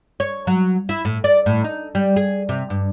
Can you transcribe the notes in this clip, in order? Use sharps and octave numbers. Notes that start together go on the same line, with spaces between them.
C#5
F#3
E4
A2
D5
A2
D#4
G3
G#4
C3
G2